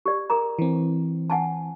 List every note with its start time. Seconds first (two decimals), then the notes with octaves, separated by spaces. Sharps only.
0.06 G4 D5
0.30 G#4 A#4 A#5
0.59 E3 C4
1.30 F#5 G#5 A5